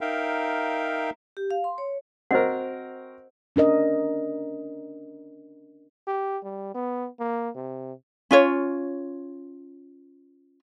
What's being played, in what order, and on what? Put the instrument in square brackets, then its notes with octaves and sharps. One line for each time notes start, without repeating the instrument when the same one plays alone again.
[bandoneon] D#4 A#4 E5 F5 G5
[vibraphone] G4
F5
C6
C#5
[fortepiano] C4 F#4 A#4 [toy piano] C5 D#5 F#5
[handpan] C#4 D4 A#4 D#5
[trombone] G4
G3
B3
A#3
C3
[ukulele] C#4 F4 C#5